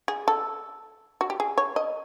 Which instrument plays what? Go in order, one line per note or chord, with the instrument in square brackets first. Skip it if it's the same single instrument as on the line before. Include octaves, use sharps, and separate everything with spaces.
[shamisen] G#4
A4
F#4
G4
G#4
C#5
D#5